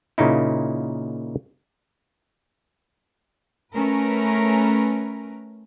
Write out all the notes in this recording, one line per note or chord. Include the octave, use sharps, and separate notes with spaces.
A#2 C#3 A#3 D#4 E4
A3 C#4 A#4 B4